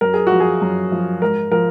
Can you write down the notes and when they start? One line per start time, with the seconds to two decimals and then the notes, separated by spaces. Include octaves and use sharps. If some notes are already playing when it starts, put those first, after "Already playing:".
0.01 F#2 A#4
0.14 G#4
0.27 F#4
0.32 F3
0.40 G#4
0.61 F#2
0.92 F3
1.22 G#2 A#4
1.52 F3 A#4